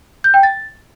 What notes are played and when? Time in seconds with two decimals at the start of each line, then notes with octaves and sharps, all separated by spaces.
0.24 G6
0.34 G5
0.43 A6